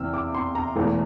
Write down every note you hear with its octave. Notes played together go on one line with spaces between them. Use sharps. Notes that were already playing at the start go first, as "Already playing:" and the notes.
Already playing: E2 C3 E3 E6 F6
D6
C6
A#5
E1 E2 E3 A3